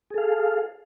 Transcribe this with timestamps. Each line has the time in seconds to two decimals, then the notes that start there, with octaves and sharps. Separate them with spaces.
0.10 G#4
0.14 A4
0.18 F5